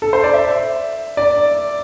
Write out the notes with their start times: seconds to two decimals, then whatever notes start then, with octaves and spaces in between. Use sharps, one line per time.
0.02 A4
0.13 C5
0.24 D5
0.34 E5
1.17 D5